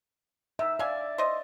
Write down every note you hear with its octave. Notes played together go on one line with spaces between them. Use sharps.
D#3 E5
D5 F5 G#5
C5 D#5